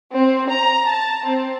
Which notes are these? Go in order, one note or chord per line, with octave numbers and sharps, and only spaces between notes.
C4
A#5
A5
C4